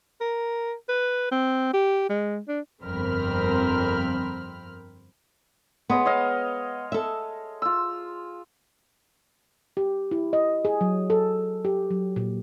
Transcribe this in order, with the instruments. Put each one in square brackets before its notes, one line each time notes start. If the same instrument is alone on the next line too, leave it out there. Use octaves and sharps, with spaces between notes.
[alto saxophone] A#4
B4
C4
G4
G#3
D4
[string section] G1 F2 C4 A#4 B5 F6
[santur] G#3 C#5 D#5 [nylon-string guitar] B3
[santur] C#5 D#5 F5
[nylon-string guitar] A4 E5
[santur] F4 E6
[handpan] G4
E4
D#5
G#4
F#3
A4
G4
F#3
A#2